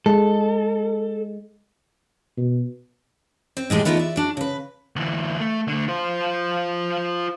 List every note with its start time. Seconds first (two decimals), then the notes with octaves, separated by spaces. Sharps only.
0.06 G#3 A4
2.37 B2
3.57 C4
3.70 A2 E3 G#3 G4
3.85 A3 B3 D#4 F4 F#4 A#4
3.97 D5 E5
4.16 D4 F#4
4.37 C#3 B4
4.96 D2 E3
5.40 A3
5.68 D3 A3
5.88 F4 C5